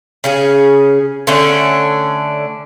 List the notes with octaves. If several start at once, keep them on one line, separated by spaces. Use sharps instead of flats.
C#3 C#4 G#4
D3 A3 C#4 D4